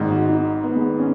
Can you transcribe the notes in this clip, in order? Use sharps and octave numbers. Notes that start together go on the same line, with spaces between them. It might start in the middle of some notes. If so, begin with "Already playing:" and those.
Already playing: G#1 G#2 D#3 D#4
F#4
D#4
B3
G#3
B3
C#4